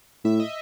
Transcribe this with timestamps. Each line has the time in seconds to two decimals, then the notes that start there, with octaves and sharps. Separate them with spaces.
0.25 A2 E5
0.40 D#5